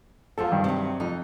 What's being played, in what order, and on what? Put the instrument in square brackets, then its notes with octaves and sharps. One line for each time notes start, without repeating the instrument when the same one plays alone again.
[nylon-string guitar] E2 F3 [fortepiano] F4 A4
[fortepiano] G2 D#3
[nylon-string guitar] C3 F#3
[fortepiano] F2 [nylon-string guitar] D#4